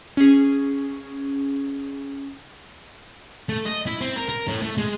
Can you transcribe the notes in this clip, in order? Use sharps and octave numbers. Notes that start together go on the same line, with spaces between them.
C#4 G#4
A3
D#5
E4
C4
A#4
A#4
A2
A3
G#3